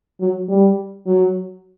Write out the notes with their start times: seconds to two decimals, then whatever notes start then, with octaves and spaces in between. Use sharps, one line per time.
0.21 F#3
0.49 G3
1.07 F#3